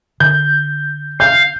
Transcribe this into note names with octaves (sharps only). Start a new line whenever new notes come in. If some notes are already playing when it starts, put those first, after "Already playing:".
D3 G6
F5 G6